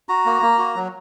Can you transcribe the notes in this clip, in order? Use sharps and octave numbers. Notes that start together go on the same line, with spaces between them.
F#4 A#5
A#3
A#3
F#4
F#3